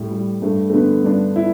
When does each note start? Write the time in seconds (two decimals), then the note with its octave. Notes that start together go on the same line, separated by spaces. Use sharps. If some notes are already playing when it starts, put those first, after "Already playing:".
Already playing: A2 G3
0.11 G3
0.42 G2 A3
0.70 A3
0.74 D3 B3
1.04 G2 D4
1.36 E4